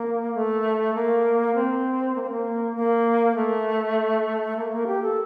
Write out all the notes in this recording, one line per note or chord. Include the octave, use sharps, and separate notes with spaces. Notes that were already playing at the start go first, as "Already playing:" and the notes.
Already playing: A#3
A3
A#3
C4
A#3
C4
A#3
A#3
A3
A#3
A#3
G4
A4